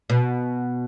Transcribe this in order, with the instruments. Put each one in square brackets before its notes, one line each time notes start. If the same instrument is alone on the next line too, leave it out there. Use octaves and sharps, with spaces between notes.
[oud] B2